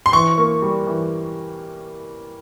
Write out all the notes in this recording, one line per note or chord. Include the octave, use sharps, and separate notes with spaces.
C6
E3 C#6
A#3
G3
E3